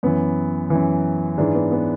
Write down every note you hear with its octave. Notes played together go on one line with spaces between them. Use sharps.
F#2 E3 B3
F#2 E3
G#2 E3 D4
B3
B3